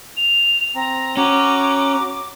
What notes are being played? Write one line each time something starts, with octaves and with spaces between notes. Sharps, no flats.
F7
C4 A#5
C#4 F#4 A#5 D6